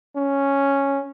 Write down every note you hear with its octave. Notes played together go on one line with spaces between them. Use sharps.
C#4